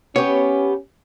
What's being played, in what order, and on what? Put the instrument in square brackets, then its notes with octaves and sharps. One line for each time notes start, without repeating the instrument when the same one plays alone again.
[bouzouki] B3 G4 [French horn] C#4 [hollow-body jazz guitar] C#5